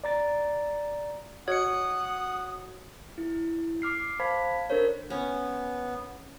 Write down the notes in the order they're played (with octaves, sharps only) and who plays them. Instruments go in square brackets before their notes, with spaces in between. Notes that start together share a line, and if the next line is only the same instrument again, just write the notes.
[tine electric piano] D5 A#5 A6
[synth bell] F#4 [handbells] C#5 C#7 [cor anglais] F#5 [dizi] D#6
[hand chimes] E4
D6 F6 C7
C5 F5 A5 B5 G#6 B6
D4 A4 A#4 C5 C#5
[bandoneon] B3 [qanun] C#4